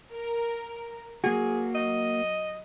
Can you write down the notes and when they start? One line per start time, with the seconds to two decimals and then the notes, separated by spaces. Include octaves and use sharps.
0.13 A#4
1.24 F#3 A#3 F#4 G#4
1.75 D#5